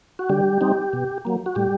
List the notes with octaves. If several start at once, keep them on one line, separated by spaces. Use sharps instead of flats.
F#4
D3 G3 G4
G3 C4 D#4
B2
F#3 A#3
F#4
A2 G3 G4